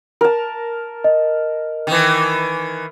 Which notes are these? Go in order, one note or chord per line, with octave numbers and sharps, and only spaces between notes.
A#4 A5
D#5
D#3 E3